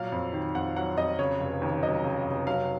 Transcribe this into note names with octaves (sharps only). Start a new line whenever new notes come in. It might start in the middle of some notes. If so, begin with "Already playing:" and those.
Already playing: A#2 F#3 F5
F2
D#3
F2 F#5
F#3 F#5
F2 D#5
C#3 C#5
F1
D#2
F#3 D#5
C#3
F1
F#3 F5